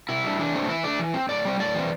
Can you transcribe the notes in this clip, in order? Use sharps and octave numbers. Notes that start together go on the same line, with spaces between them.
C3 E4
G3 D4
E3 D4
A3 C4
E3 E4
A3 D4 D5
E3
C4
A2 D5
G3 C4
A2 D5
E3 C4